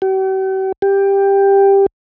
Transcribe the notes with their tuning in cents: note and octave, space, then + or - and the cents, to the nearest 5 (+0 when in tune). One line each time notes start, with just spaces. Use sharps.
G4 -45
G4 +10